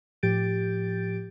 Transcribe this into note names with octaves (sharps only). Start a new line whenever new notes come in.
A2 F3 G4 G6 A6 D7